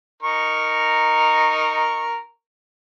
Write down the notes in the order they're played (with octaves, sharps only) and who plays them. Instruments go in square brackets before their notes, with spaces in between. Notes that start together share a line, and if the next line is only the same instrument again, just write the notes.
[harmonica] D#4 A#4 C#6